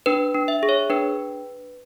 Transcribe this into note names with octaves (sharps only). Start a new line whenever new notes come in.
D4 B4
D4
E5
G#4
C#5
D4 B4